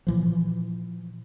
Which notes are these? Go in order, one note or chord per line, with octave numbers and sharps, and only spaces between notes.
A#2 E3 F3